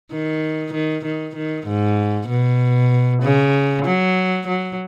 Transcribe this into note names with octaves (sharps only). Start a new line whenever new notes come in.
D#3
D#3
D#3
D#3
G#2
B2
C#3
F#3
F#3